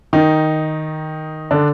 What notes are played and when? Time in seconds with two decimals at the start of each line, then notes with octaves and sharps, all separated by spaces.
0.13 D#3 D#4
1.51 D3 D4